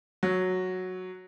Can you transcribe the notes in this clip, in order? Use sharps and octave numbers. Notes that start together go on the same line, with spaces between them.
F#3